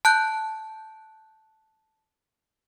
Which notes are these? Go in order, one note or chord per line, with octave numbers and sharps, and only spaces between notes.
A5 F#6 G6